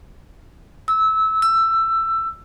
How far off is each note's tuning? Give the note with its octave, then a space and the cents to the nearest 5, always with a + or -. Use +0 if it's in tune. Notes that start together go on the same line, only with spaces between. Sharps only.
E6 -20
E6 +15